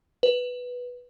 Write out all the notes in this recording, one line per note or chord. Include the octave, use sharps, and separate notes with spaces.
B4